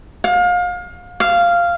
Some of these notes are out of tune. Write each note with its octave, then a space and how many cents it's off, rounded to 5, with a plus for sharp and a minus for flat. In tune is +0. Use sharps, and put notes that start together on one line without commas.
F5 +30
F5 -10